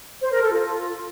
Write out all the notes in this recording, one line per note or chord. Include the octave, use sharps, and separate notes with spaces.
C5
A#4
A4
F4